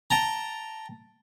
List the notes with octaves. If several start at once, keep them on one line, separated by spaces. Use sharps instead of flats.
G5 A5 A#5